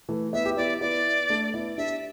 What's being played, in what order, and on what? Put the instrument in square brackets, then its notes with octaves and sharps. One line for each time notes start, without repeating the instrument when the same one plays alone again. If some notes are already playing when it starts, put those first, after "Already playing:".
[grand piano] E3 A3
[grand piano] B3 E4 [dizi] E5
[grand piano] G4
[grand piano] B3 E4 [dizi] D5
[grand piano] B3 E4 [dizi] D5
[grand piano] A3 D4
B3 E4
[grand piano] D4 G4 [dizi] E5